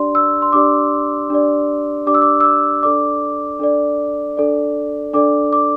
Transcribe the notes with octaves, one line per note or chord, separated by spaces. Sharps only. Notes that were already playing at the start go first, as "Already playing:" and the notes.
Already playing: D4 G4 D5 C6
E6
C6
D4 G4 D5 D6
D4 G4 D5
D4 G4 D5 D6
E6
D6
E6
D6
D4 A4 D5 D6
D4 A4 D5
D4 A4 D5
D4 A4 D5 D6
D6